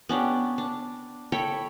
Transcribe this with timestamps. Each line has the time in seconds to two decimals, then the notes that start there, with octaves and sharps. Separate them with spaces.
0.09 B3 C#4 D4 G4
0.58 D4
1.32 A4 C#5 G5 B5